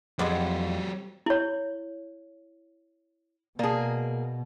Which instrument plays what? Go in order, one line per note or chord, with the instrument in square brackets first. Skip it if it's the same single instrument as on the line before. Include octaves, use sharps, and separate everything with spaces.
[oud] F2 [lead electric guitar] F#3 G4 [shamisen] G#3 B3 D4
[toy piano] E4 C#5
[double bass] B2 [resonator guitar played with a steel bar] A#3 G#4 [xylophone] D5 A5